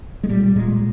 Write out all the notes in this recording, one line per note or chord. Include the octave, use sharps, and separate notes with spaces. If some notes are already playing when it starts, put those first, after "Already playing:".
G#3
A#2 G3
A#2 G#3